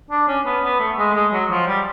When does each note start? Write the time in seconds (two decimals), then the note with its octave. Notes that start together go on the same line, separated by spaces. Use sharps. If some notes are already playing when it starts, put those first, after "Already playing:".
0.11 D4
0.28 C#4
0.45 B3
0.63 B3
0.80 A3
0.98 G#3
1.14 G#3
1.32 F#3
1.50 F3
1.67 G3